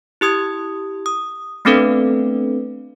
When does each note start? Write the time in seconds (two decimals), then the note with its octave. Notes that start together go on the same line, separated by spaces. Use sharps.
0.21 E4 G4 D#6 G#6
1.06 D#6
1.65 A3 B3 C4 D4 A4 B4